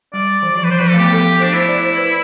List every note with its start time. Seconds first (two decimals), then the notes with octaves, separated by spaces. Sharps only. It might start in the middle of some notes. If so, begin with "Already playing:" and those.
0.13 G3 D5
0.43 E3
0.56 F3
0.64 B4
0.70 E3 C5
0.80 F3 B4
0.89 A3 A4
0.98 B3 G4
1.13 A4
1.40 D4 C5
1.54 E4 C5
1.68 D5
1.83 C5
1.97 B4